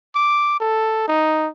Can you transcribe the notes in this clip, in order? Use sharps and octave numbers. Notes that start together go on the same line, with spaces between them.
D6
A4
D#4